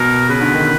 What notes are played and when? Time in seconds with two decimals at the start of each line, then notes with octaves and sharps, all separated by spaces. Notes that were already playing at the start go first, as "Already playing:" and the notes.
Already playing: B2 A#4
0.29 C#3 B4
0.41 D3
0.54 D#3